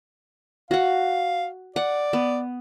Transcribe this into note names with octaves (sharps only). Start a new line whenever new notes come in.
F#4 F5 F#5
D5 F#5
B3